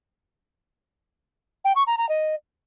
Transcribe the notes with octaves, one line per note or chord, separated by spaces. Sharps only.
G5
C#6
A#5
A#5
D#5